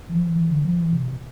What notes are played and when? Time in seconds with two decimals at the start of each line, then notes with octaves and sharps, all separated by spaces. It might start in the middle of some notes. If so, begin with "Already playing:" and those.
0.09 E3
0.15 F3
0.25 E3
0.35 E3
0.50 D3
0.64 F3
0.79 E3
0.93 C3
1.03 B2